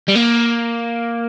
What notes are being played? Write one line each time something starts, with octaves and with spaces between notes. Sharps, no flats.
G3
A#3